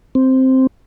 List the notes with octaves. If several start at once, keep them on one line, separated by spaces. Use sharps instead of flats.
C4